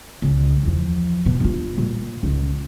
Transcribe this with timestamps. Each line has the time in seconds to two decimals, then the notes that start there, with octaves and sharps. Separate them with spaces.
0.22 C#2
0.63 E2 F3
1.25 B2 F3
1.40 G2 F4
1.77 A#2 G3
2.23 C#2 F4